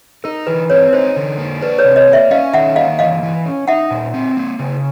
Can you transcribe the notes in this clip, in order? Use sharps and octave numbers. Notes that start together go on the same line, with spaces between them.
D#4 A#4
E3 B4
C4 B4 C#5
D#4 C5
D3
A#3
D4 B4
B4 C#5
C3
C#5 D#5
A#3
D5 E5
C#4 D#5 F5
D#3 E5 F#5
A#3 D#5 F5
E3 D#5 F5
E3
C#4
D#4 E5 F#5
A#2
C4
A#3
C#3